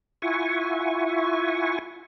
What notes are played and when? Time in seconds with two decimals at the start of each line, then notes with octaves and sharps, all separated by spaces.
0.22 E4 F4 E5 F#5 G#5 C#6